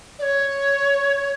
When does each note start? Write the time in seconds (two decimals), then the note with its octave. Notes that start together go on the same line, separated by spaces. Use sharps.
0.19 D5
0.22 C#5